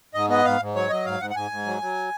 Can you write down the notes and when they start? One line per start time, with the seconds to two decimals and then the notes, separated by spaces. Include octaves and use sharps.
0.14 G#2 D#5
0.30 B3 D#5
0.45 G#2 F5
0.61 G#2
0.75 F#3 C#5
0.90 F#3 D#5
1.05 G#2 F5
1.20 G#2 F#5
1.30 F#5
1.35 G#2 G#5
1.51 G#2
1.66 F#3
1.82 F#3